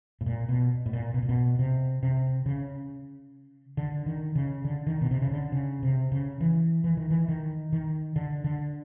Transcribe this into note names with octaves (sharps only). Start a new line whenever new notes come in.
A2
A#2
B2
A2
A#2
B2
A#2
B2
C3
C3
C#3
D3
D#3
C#3
D3
D#3
B2
C3
C#3
D3
C#3
C3
C#3
E3
E3
D#3
E3
D#3
D#3
D3
D3